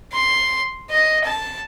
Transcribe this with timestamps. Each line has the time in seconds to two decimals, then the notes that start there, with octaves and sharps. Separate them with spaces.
0.12 C6
0.90 D#5
1.24 A5